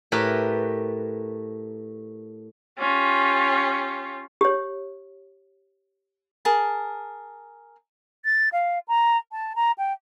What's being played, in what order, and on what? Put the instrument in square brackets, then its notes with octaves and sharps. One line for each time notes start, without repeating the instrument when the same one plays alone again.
[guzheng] A2 G4 A#4 B4
[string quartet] C#4 F4 G4
[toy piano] G4 C#5
[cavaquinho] G#4 A#4 A5
[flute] A6
F5
A#5
A5
A#5
G5